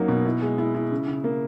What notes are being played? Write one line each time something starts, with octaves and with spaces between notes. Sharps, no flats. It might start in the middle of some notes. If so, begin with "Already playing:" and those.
Already playing: F#2 F#3 A#3 D#4
B2
E4
G#3
E4
E4
C#3
C#3
A#3